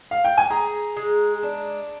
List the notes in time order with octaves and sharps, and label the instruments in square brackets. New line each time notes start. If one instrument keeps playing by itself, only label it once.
[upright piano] F5
G5
G#5
[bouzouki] G#4 [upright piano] A#5
[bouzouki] G#3
D4